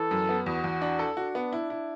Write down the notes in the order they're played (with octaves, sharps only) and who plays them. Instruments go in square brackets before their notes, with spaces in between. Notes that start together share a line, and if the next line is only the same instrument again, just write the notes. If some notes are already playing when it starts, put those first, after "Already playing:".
Already playing: [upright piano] E3 [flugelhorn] A4
[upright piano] F#2
B3
[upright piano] E2 [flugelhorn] F#4
[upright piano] E2
D4
A4
[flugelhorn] D4 [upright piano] F#4
[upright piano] B3
E4
E4